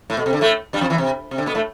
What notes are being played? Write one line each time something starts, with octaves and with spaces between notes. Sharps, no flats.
A2
B2
C3
D3
A2 A3
G2 G3
F2 F3
E2 E3
C3
C3
D3
B2 B3
A2 A3